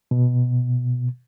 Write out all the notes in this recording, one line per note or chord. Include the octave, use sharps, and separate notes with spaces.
B2